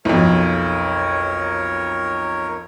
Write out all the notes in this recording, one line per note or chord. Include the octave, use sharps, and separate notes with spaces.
B1 F2 A#4 C#5